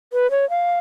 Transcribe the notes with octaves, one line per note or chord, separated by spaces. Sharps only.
B4
C#5
F5